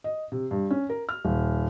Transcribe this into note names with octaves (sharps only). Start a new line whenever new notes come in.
D#5
C3
G2
C#4
A#4
F6
D#1